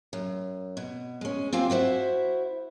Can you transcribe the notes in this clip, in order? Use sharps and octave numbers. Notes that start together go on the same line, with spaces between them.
F#2
B2
G#3 C#4
C4 F4 G4 F5 G#5
E4 F#4 C5 E5